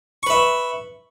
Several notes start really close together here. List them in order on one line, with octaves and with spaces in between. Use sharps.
C#6 B4 E5